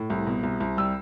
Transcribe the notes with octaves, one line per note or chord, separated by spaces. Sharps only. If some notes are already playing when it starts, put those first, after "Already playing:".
Already playing: A2
C2
B2
C2
C2
G3 E6